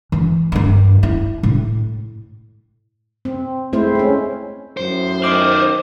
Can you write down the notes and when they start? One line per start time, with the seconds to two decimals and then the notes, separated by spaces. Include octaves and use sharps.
0.12 E3
0.52 G2 A#3
1.03 E4
1.43 A2
3.25 C4
3.73 G#3 A3 C4 E4 C5
3.95 G#3 C#4
4.77 F#2 A2 C5
5.24 B1 D#3 D6